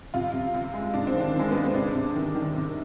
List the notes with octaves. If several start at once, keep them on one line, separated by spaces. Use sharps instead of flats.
C3 F4
C3
C3
G#3
C3 D4
C4
D#3
D4
D#3
G#3
G#3 B3
C4
C3 D4
C3
D#3
D#3
C3